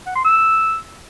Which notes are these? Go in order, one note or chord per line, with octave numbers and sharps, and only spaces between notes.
F#5
C6
E6